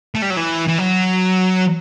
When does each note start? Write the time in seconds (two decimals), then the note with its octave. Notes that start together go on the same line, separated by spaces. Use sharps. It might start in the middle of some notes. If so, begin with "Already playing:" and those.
0.15 A3
0.22 G3
0.30 F#3
0.37 E3
0.68 E3
0.78 F#3